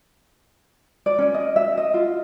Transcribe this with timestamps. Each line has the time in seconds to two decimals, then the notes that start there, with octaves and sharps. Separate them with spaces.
1.06 D5
1.19 C#4
1.34 D#5
1.56 E5
1.77 D#5
1.94 F4